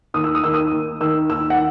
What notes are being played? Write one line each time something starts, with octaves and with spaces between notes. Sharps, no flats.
D#2 D#6
E6
D#6
D#3 E6
D#6
D#2
D#3 E6
D#2 E6
F#5